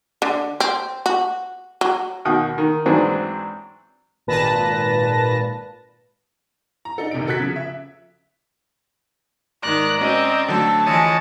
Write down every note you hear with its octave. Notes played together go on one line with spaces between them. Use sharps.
D3
C4
F#4
F#3
D#2 B2 F#4 G5 D#6
D#3
G#2 E3 F#3 C4 D4
G#1 A#2 B4 A5 A#6
A#5
D4 D#4 A4
F1 C3 D#3 D7
F#4 A4 F#6 G#6 B6
C#3 F3
E5
G#2 D#3 D5 A#5 F#6
C4 C#4 F#4 D#5
D3 F#3 A3 A4
E3 F3 G#3 C#5 D#5 A5